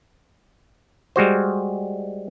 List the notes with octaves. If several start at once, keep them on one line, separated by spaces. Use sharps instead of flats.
G3 G#3 F#4 C5